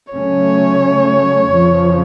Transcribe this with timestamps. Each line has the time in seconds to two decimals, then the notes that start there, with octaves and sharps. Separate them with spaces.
0.13 C#3 F#3 A3 C#4 C#5
1.47 F2 C#3 F3